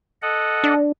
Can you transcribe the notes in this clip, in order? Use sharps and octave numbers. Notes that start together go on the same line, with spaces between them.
A4 D#5 F#5
D4